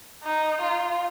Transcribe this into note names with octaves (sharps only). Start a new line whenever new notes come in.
D#4
F4